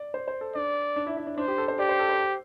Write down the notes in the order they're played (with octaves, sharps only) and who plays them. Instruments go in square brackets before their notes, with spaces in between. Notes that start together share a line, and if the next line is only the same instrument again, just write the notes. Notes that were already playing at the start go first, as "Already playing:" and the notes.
Already playing: [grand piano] D5
C5
C5
A4
[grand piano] D4 [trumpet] D5
[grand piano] D4
E4
E4
D4
[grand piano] D4 [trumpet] C5
[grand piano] G4
A4
C5
[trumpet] G4 [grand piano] D5
[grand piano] C5
A4
C5